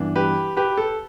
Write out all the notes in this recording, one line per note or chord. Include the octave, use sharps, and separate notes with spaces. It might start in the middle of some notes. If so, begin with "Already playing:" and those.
Already playing: G2 E3 B3 D4
G4 B4
G4 B4
A4